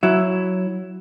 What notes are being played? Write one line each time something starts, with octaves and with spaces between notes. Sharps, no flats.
F#3 E4